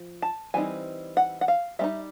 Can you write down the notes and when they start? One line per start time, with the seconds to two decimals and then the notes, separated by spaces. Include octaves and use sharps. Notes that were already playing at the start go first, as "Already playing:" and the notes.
Already playing: F3
0.22 A5
0.54 E3 G3 C4 D#4 G#5
1.17 F#5
1.41 F#5
1.48 F5
1.79 G3 C4 E5
1.84 D#4